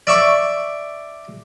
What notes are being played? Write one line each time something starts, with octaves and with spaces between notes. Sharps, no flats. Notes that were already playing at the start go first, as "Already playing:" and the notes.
D5 E5 C#6 D6